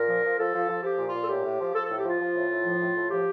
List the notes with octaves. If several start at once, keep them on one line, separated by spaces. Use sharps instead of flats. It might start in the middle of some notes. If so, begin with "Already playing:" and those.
Already playing: A#2 A#4
F3
F3
F3 A4
F3
F3
F3 G4
A#2
F4
A#2
A4
A2 G4
A2
F3
F3 A4
A2 A4
G4
F3 F4
F3
A2
A2
F3
A2
A2
F3 G4